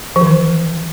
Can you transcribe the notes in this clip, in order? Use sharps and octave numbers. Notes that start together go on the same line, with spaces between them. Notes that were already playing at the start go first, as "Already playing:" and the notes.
F3
D#3
E3